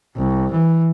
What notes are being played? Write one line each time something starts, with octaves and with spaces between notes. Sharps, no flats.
C2
E3